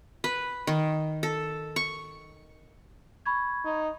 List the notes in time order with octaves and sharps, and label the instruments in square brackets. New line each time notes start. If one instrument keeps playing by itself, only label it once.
[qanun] B4
D#3
A4
C#6
[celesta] B5 C#6 G#6
[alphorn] D#4